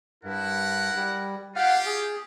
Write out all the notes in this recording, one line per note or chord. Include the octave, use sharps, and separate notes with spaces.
G2 E4 A#4 F#5
G3
F4 G4 F5 F#5 F6
G#4